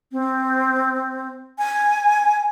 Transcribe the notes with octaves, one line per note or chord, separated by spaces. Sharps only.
C4
G#5